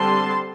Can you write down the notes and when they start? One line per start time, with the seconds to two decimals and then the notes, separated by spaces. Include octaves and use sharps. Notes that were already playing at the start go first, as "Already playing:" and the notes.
Already playing: D3 G3 C4 A5 C6